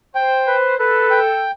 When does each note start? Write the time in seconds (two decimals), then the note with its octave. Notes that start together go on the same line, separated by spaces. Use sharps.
0.15 C5 G5
0.47 B4
0.79 A4 B4
1.11 G5